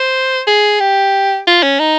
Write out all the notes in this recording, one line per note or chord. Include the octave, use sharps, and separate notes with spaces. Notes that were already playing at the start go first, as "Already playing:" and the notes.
Already playing: C5
G#4
G4
F4
C#4
D#4